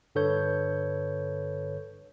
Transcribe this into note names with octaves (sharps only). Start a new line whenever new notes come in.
G2 D3 A4 B4 C#5 G6